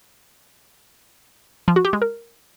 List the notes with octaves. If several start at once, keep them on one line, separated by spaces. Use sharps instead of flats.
F3
F#4
G4
G#3
A#4